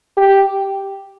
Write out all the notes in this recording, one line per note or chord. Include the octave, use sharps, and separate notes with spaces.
G4